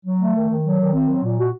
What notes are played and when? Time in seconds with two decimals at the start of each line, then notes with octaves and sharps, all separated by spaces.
0.05 F#3
0.20 A3
0.35 D#3
0.49 D#3
0.65 F#3
0.79 D#3
0.94 C4
1.09 F#3
1.23 A#2
1.39 F#4